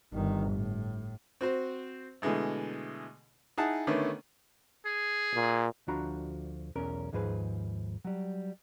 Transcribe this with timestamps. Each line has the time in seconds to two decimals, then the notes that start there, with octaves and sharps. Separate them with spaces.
0.13 G1 D#3
0.51 A2
1.41 C4 F#4 C5
2.22 B2 D3 E3 G#3 A3
3.58 D#4 E4 G#4 F#5 A5
3.87 D3 D#3 A3 B3 C#4
4.86 G#4
5.34 A#2
5.88 D2 F3 D4 F#4 A#5 B5
6.75 B1 E2 C#4 A#4
7.12 D#2 G#2 F3 G#4 B4 C5
8.05 F#3 G3